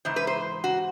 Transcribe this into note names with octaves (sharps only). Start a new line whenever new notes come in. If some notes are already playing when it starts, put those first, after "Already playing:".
G#2 E3 C5
B4
C5
F#4